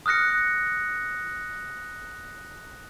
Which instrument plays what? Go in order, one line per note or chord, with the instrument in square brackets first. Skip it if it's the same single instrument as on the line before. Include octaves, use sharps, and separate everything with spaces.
[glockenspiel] D#6 F6 F#6 A#6 C#7